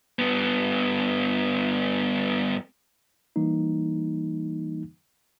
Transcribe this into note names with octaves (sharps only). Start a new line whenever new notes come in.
G2 B3
E3 G3 A#3 D#4